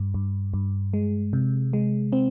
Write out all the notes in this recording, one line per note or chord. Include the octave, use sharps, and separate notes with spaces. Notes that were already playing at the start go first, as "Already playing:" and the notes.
Already playing: G2
G2
G2
G#3
C3
G#3
C4